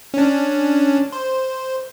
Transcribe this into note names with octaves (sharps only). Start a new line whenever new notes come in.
C#4 D4
C5